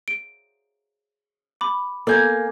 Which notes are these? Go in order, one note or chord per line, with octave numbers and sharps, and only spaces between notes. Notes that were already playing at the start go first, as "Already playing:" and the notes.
D7
B5 D6
A#3 A4 G#5 G6 G#6